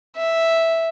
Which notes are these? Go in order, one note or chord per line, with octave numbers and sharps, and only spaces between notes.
E5